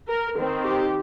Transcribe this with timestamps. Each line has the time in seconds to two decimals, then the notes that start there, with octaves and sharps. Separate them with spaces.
0.09 A#4
0.36 D#3 C4
0.64 G4